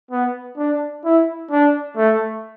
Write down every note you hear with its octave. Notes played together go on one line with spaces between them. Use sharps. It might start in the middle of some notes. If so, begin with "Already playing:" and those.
B3
D4
E4
D4
A3